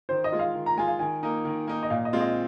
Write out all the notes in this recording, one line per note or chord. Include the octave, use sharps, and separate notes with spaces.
D#3 C5
D#5
G#3 F4
F5
D#3
A#5
G#3 F4 G#5
F5
D#3 G#5
A#3 D#4
D#3
A#3 D#4
D#5
A#2 F5
D#5
G#3 C4 F4
D#5